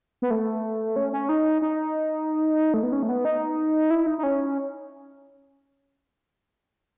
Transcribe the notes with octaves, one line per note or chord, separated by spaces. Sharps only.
B3
A3
C#4
C#4
D#4
D#4
A3
B3
C#4
A3
B3
D#4
E4
D#4
D#4
C#4